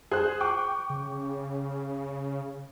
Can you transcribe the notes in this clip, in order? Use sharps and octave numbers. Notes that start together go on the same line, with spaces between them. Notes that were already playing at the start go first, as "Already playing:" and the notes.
G#4 C5 F#6
G5 C#6 D6
C#3